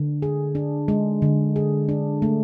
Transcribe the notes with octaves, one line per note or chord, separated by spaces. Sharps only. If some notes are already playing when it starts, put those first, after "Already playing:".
Already playing: D3
G#4
D4
G#3
D3
G#4
D4
A3